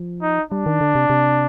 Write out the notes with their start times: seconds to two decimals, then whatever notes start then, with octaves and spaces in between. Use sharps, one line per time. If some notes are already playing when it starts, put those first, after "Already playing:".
Already playing: F3
0.22 D#4
0.51 G3 D4
0.66 D#3
0.81 D3
0.95 C3
1.10 C3